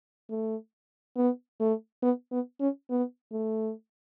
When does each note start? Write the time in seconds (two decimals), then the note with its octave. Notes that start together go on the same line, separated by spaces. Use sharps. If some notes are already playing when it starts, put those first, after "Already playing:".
0.30 A3
1.16 B3
1.60 A3
2.03 B3
2.32 B3
2.60 C#4
2.90 B3
3.32 A3